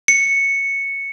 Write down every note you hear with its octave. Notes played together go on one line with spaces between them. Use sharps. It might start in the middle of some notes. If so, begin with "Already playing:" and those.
C#7